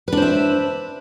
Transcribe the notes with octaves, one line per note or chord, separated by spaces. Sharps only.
D4 B4 C5 E5